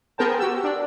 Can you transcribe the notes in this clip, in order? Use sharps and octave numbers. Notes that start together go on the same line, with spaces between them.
B3 G#4 A#4 C5 G5 A5
F#4 G4 E6
D4